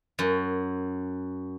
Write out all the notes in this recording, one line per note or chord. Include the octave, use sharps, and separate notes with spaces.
F#2